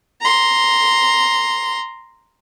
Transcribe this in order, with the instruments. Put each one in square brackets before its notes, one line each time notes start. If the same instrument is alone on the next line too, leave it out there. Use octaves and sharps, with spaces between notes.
[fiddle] A#5 C6